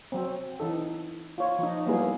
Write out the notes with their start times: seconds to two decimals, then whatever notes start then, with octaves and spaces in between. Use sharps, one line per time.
0.12 F#3 C4
0.60 E3 D#4 A4
1.38 F4 C#5
1.59 F3 D#4
1.86 F#3 G3 A#3 B3 E4 G#4